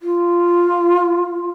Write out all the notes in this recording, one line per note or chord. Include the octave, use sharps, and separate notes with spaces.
F4